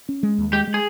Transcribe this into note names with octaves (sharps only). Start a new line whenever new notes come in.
C#4
G#3
D#2
G#3 G4
G#3
G#4